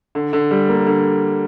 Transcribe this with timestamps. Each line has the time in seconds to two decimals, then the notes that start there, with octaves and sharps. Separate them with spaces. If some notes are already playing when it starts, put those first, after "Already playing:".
0.15 D3
0.33 D3
0.51 G3
0.69 A#3
0.87 D3